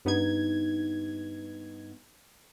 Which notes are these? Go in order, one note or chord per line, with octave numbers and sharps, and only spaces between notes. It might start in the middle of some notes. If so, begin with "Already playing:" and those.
G2 B3 D#4 G#6